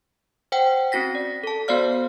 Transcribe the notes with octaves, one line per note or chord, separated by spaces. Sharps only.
C5 F#5 G5
C4 C#4 F#4 A#6 B6
D5
A4 A5
B3 F#4 C5 D5 F5 F6